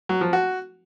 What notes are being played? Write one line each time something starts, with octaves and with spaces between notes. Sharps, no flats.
F#3
F3
F#4